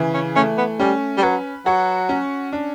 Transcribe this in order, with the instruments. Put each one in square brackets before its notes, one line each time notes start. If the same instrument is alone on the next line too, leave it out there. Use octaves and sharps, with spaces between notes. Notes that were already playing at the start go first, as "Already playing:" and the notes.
Already playing: [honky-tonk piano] C#3 E3
[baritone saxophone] C#4
[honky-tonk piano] A3 [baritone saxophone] C#4
[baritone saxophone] B3
[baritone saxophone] G3 [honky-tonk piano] C#4
[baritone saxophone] G3
[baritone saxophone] F#3 [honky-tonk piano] B4
[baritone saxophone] F#3 [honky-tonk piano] F#4
[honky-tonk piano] C#4
D4